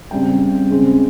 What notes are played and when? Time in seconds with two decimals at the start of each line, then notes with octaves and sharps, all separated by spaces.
0.11 C#3 G3 C4 G5
0.69 C#3 G#3 C4